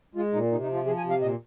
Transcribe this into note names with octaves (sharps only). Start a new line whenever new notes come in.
G#3 F4
A#2 D#4
C3 D#4
D#4
F3
F4
F3 G#4
G#5
C3
F5
A#2 D#5